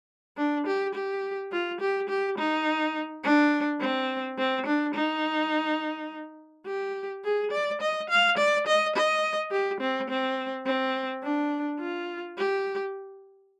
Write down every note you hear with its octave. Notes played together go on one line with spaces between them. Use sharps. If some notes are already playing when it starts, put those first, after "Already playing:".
D4
G4
G4
F4
G4
G4
D#4
D4
C4
C4
D4
D#4
G4
G#4
D5
D#5
F5
D5
D#5
D#5
G4
C4
C4
C4
D4
F4
G4